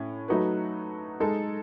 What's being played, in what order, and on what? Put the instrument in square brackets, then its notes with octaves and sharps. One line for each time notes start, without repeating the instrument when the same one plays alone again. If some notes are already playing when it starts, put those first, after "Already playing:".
Already playing: [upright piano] A2 C#4
F#3 A3 D#4 F#4 B4
G#3 D#4 A4